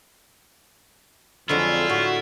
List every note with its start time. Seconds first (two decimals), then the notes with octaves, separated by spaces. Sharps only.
1.49 F2 D3 F#3 G#3 E4 F4
1.89 A2 F#4